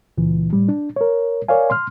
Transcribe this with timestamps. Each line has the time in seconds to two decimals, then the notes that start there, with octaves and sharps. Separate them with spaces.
0.18 C#2 A#2 E3
0.53 A2 G3
0.69 D4
0.96 A#4 C#5
1.48 A#4 C#5 D5 F5 G#5
1.70 C6 F6